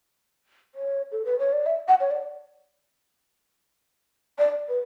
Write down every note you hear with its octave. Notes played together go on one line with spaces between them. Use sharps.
C#5
A4
B4
C#5
D5
E5
F#5
C#5
D5
D5
B4